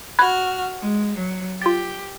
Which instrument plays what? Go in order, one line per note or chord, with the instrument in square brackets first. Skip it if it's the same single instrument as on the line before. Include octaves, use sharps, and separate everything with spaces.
[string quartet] F#4 F6 [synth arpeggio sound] B5 F#6 G#6
[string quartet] G#3
F#3
[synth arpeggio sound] F4 A6 [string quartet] G4